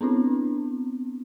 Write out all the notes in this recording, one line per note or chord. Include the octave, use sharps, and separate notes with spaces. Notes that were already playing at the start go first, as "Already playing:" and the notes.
B3 C4 D4 E4